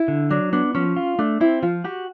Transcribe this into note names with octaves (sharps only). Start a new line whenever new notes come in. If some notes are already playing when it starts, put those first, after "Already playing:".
Already playing: E4
D3
F#3 D4
B3 D4
F3 C#4
F4
A3 D4
C4 E4
F3 F4
F#4 G4